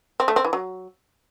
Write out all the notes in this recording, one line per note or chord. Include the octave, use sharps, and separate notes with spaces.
C4
A3
C4
E3
F#3